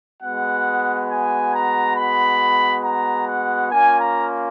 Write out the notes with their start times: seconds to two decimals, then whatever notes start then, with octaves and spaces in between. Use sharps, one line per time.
0.22 G#3 B3 F#4 F#5
1.10 G#5
1.54 A#5
1.96 B5
2.85 A#5
3.27 F#5
3.71 A#3 C#4 F4 G#5
4.00 A#5